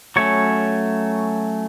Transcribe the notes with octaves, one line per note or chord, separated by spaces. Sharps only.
F#3 A3 C#4 C#5